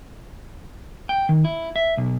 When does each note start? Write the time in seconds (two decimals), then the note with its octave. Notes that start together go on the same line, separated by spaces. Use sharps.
1.09 G5
1.29 D#3
1.44 E4
1.76 E5
1.97 B1